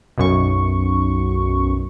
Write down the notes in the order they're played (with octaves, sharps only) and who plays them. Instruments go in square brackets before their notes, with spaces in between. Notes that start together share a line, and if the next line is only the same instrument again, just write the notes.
[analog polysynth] B1 F#2 C#6